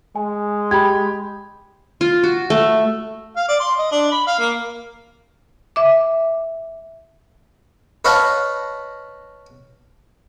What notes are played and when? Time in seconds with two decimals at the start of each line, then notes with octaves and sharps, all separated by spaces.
0.16 G#3 G#5
0.71 G4 B5 G#6
2.01 F4
2.23 F#4
2.50 A3
3.36 F5
3.48 D5
3.60 C6
3.78 D#5
3.91 D4
4.12 B5
4.27 F5
4.39 A#3
5.76 E5 D6
8.05 B4 C#5 D#5 F5 A5